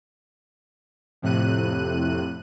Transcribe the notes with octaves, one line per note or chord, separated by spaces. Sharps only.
F2 A2 C3 F#6 D#7